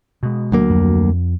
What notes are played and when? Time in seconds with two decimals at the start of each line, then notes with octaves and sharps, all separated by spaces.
0.23 B2 G#3
0.52 D2 F#3 A#3
0.70 F2